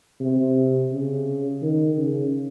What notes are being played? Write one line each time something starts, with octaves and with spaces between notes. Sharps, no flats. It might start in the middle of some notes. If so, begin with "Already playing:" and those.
C3
C#3
D#3
C#3